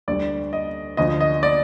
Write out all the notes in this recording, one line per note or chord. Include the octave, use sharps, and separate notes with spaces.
D2 D3 G3 D5
D#5
D2 D3 F3 D#5
D#5
D5